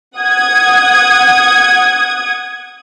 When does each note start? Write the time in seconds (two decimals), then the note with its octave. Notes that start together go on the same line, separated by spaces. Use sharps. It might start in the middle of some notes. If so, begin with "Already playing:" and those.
0.17 F#5 D#6 G#6